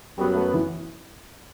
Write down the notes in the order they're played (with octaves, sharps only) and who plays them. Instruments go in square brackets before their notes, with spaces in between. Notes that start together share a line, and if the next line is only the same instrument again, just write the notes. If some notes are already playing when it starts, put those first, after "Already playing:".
[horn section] F#2 F#3 B3 [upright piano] G3
[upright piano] A3
E3